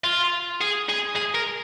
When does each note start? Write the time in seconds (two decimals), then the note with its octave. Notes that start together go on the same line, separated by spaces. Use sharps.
0.04 F4
0.61 G#4
0.89 G#4
1.16 G#4
1.35 A#4